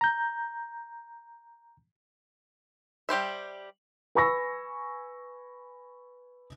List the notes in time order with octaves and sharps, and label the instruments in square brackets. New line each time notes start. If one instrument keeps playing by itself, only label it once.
[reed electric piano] A#5 G6
[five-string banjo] G3 G4 C5 E5
[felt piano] B4 G#5 B5 C#6 E6 A#6